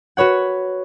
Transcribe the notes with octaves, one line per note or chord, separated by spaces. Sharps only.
F#4 B4 C#5 F#5